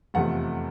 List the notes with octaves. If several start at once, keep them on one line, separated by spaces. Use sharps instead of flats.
F1 E2 C3 F3 A3 F#5